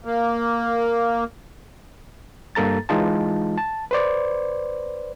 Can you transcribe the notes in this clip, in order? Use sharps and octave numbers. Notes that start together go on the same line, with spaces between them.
A#3
G2 A#3 A4 A#5 A6
E3 G#3 D#4 F4 A5
A5
B4 C5 D5